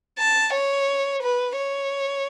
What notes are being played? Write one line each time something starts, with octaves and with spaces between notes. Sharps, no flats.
A5
C#5
B4
C#5